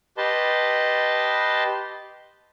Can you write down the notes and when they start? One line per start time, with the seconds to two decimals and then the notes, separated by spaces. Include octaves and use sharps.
0.18 G4 B4 D#5 A5 C6